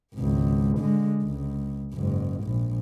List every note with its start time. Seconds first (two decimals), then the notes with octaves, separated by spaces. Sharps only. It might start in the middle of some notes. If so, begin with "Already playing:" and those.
0.15 G#1 C#2
0.79 D3 G#3
1.24 C#2
1.94 F#1 G#2
2.43 A#1